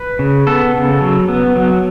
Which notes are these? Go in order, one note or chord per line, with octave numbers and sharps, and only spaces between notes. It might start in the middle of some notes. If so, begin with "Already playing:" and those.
Already playing: B4
C#3
B3 A4
C#3
F#3
B3
F#3